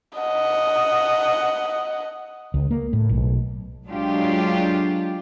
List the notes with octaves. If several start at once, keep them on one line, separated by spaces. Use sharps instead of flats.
D#5 F#5
C#2
A#3
A2
B1
F#3 G#3 D4 F4 G4